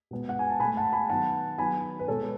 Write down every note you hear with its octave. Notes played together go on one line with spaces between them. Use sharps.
B2 G#3 B3
F#5
G#5
A5
B2 A3 G#5 B5
F#5 A5
G#5 B5
D#3 F#3 B3 F#5 A5
D#3 F#3 B3 G#5 B5
B4
B2 G#3 B3 A4 C#5